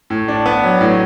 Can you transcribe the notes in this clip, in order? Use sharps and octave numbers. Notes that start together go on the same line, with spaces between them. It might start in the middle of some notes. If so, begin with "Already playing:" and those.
A2
D4
B3
F#3
A2